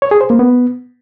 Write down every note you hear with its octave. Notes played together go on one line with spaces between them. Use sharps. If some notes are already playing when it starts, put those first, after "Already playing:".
C#5
G#4
C5
A#3
B3